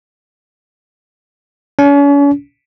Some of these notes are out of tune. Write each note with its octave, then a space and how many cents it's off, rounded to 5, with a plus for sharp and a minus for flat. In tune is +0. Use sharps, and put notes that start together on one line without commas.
C#4 +40